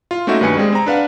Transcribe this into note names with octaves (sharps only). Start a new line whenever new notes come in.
F4
A3 A#3 C#4 D#4 F#4 E5
G2 D#3 B4 G#5 C#7
G3 G#3 C4 G#4
C4 A#5
D4 B4 F5 F#5